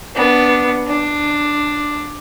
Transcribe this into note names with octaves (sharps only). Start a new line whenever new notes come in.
B3 D4
D4